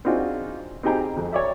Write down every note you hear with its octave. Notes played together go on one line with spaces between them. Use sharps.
C4 D4 D#4 F4 F#4 G#4
C4 D#4 G4 G#4 G5 A#5
F2
C#5 D5 E5